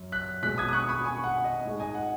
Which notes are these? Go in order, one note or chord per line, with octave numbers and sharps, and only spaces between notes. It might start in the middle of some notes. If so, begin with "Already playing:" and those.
Already playing: F#2 F#3
F#6 B6
B2 G#3 F#6 B6
D#6 G#6
D#6
C#6 F#6
B5 D#6
G#5 C#6
F#5
D#5
G#2 G#3
D#5 G#5
F#5